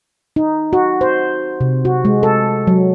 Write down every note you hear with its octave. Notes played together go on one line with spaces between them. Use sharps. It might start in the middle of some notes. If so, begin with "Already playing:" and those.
D#4
F#4
C5
C3
F#4
G#3
A4
F#3